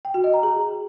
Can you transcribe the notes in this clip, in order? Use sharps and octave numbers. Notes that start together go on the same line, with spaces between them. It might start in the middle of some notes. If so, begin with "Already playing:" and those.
G5
F#4
D#5
A#5
G#4